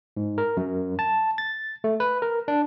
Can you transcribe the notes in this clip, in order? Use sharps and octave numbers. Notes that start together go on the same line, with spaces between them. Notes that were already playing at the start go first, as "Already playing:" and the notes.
G#2
A#4
F#2
A5
A6
A3
B4
A#4
D4